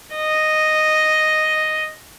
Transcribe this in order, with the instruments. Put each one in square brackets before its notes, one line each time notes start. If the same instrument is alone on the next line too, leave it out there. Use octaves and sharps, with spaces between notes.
[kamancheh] D#5